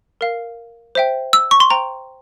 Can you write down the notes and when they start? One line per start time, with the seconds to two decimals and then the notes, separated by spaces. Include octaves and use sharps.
0.21 A#4 F5
0.95 C5 E5 G5
1.33 E6
1.51 C#6
1.60 C6
1.70 C5 G5 A#5